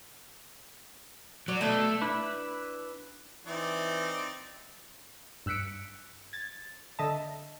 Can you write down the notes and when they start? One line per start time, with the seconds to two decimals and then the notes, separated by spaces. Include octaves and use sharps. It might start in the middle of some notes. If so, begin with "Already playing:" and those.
1.48 F#3 D5
1.61 B2 A3 D4 A4
2.01 D4 E4 B4
3.47 E3 C4 D#4 D5
5.46 G2 E6 F#6 B6 C#7 D7
6.33 G#6 A6
6.99 D3 D#5 E5 A5